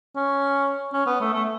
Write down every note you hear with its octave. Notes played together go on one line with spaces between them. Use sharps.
C#4
C#4
B3
A3
A3